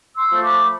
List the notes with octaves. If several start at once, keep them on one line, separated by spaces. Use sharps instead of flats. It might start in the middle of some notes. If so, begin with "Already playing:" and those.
C6 E6
F3 A3
B5 D6